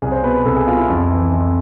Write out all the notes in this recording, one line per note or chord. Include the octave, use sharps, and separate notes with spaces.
C2 G#4
C5
B2 B4
B4
C2 A4
G#4
B2 F4
E4
F2
E3
F2